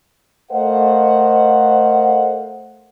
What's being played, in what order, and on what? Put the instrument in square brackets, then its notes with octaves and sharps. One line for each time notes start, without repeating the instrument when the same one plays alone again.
[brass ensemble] A3 A#4 C5 D#5 F5 F#5